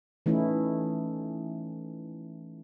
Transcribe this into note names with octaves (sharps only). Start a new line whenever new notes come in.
E3 A3 C#4 D#4 E4